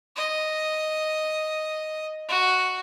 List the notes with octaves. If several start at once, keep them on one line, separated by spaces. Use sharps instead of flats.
D#5
F#4